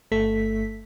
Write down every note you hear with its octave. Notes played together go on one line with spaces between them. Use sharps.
G1 A3 A4 B6